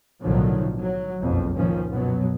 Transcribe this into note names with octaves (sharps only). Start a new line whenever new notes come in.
B1 A2 D3 D#3 F3 F#3
F#3
F#1 B1 F2
C#2 A#2 D#3 F3 C#4
F#2 B2 F#3 B3